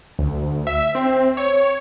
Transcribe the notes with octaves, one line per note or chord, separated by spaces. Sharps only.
D2
E5
C4
C#5